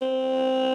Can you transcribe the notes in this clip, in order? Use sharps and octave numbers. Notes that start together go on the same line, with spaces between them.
C4